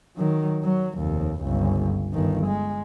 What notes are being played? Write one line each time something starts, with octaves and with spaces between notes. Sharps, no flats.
D#3 F#3
F#3
F1 D#2
G1 C#2
G1 D#3
G#3